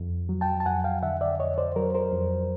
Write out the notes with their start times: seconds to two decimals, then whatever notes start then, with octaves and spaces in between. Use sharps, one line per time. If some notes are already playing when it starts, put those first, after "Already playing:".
Already playing: F2
0.29 F#3
0.41 G5 A5
0.60 A5
0.66 F2 F#5 G#5
0.84 F5 G5
1.02 D3 E5 F#5
1.21 D5 E5
1.40 F2 C#5 D#5
1.58 C5 D5
1.76 F#3 A#4 C5
1.95 A#4 C5
2.13 F2